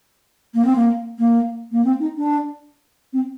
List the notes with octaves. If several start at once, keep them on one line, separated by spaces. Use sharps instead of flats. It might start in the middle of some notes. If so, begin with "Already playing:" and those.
A#3
C4
A#3
A#3
A#3
C4
D#4
D4
C4